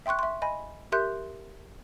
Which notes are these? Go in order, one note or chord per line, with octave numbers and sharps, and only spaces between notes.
E5 G5 C6 C#6 F#6
E5 C6
D#5 G#5 B5
G4 A#4 E5 C6 F#6 G6